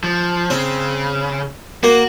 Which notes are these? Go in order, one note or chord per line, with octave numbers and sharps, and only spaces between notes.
F3
C#3 C4
A#3 F#4